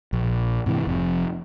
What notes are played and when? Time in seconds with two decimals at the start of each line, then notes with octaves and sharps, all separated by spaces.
0.13 A#1
0.66 G#2 C3 E3
0.87 F1 F2